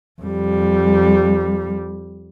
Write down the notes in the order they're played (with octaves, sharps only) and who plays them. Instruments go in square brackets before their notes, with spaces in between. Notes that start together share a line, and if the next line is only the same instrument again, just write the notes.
[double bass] F2 G3